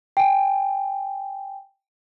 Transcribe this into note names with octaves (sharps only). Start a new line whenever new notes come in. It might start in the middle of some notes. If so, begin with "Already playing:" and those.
G5 G#5